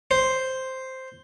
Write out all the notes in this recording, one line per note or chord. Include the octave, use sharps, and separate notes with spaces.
C5